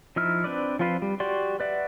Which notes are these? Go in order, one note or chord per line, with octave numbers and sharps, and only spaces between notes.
F3 D#4 E4 E6 F6
C4 D4 B4 D5
F3 C4 F4 B4 C5
G3
F#4 G4 D5 C6
B4 D5 E5 F#5